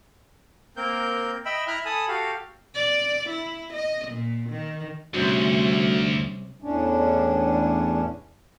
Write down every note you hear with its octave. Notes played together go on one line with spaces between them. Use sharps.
A#3 C4 A#4 G6
D#5 E5 G5 B5 E6
E4 E5 A#5 B5 F6 F#6
A4 G#5 A5 B5 D#6
F#4 G4 A4 F5
D5
E4
D#5
A#2
D#3
D2 C3 G3 C4 C#4 F#4
E2 A2 C#4 D4